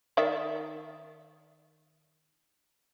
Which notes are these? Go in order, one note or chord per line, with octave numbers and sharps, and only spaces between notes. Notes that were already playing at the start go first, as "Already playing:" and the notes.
D#3 D5 E5